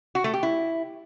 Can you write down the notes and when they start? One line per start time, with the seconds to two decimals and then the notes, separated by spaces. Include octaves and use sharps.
0.15 F#4
0.24 A3
0.34 G4
0.43 E4